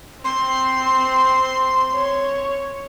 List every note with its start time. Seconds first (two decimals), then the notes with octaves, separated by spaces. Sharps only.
0.24 C4 C6
1.94 C#5